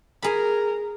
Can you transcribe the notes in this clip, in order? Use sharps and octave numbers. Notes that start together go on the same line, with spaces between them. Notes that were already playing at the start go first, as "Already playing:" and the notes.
G#4 A#4 B5